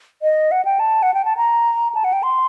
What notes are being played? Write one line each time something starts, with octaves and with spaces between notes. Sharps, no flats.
D#5
F#5
G5
A5
F#5
G5
A5
A#5
A5
F#5
G5
C6